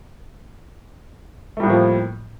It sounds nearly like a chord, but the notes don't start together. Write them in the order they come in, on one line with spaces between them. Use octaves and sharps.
A3 G3 A2 A#3 F3